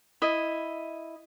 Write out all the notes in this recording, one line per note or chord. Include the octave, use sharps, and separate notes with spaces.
E4 D#5